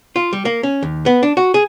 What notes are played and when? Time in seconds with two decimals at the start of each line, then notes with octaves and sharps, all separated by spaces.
0.16 F4
0.33 G3
0.45 A#3
0.63 C#4
0.83 D#2
1.06 B3
1.23 D4
1.37 F#4
1.54 G#4